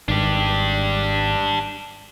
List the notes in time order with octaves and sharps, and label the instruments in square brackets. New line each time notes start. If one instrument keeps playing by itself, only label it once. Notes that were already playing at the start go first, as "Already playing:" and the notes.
[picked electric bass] G#1 [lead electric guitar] D4 G4